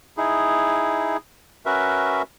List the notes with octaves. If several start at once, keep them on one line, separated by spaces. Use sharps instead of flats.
D#4 E4 G#4
C#4 F#4 A#4 B4 E5